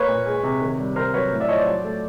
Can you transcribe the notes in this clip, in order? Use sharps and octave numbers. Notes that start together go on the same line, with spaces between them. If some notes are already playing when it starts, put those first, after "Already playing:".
Already playing: A#3 B4 C#5
A#2
G#3
C3
D#3
G3
C3 A#4 C5
F#3 B4 C#5
A2
D5 E5
F3 C#5 D#5
C5 D5
F#3
A3